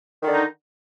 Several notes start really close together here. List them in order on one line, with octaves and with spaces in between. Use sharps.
D#3 D3 D#4